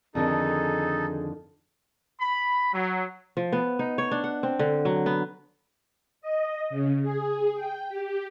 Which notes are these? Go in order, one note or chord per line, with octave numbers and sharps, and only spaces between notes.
F2 D3 D#3 D#4 G#4 A4
B5
F#3
F3
B3
D#4
C#5
D4
F#5
C4
D3
F#3
B3
D#5
C#3
G#4
G5
G4